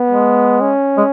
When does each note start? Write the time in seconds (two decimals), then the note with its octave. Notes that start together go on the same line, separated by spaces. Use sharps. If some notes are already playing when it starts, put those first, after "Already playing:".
Already playing: B3
0.10 G#3
0.61 C#4
0.97 G#3